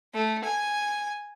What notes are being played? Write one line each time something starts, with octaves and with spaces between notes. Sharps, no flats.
A3
G#5